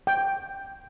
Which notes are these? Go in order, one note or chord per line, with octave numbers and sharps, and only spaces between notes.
G5